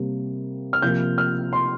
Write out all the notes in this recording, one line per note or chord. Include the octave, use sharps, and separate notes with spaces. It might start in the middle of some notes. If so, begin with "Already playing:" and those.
Already playing: C3 G3 A#3
F6
C3 F3 A#3 G6
F6
C6